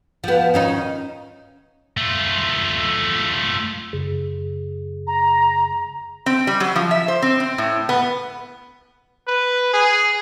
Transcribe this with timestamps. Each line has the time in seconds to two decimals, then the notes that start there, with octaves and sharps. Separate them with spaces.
0.24 F3 B3
0.54 D#3 C#4 D#4
1.97 A3 F4
3.93 F#2 C#3 G#4
5.07 A#5
6.26 C4
6.47 G3
6.60 F#3
6.76 F3
6.91 E5
7.08 C5
7.22 C4
7.40 C4
7.58 A2
7.89 B3
9.27 B4
9.74 G#4